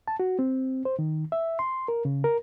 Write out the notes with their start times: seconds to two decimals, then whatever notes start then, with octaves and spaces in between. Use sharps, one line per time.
0.08 A5
0.20 F#4
0.39 C4
0.85 C5
0.99 D#3
1.32 E5
1.59 C6
1.88 A#4
2.05 C#3
2.24 A#4